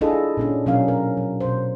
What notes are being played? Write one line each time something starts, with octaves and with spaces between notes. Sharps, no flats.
D4 E4 F4 G#4 A4 D#5
A#2 C#4 D4
B2 F#3 C#4 D4 A#4 F5
A#4
F#3
B2 C5